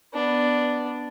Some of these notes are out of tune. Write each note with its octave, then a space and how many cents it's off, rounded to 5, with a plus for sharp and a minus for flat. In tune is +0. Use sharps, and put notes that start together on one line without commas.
B3 +0 D4 +0